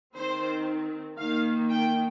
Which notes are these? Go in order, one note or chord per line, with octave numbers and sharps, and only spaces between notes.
D#3 C4 C5
D#3 A#3 F5
G5